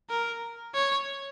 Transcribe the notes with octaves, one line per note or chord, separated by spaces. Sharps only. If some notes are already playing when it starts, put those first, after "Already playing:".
A#4
C#5